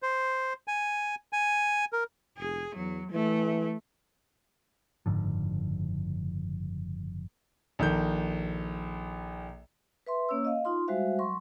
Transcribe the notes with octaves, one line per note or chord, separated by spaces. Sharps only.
C5
G#5
G#5
A#4
F1 G#4
E2 F#3
E3 A3
F#1 G#2 D3 F3
A#1 D#3 A4 G6
B4 E5 C6
A#3 C#4 C#5 E6
D#5 F5
D#4 F4 C6
G3 G#3 F#4 C5 E5 F5
F#3 C6 C#6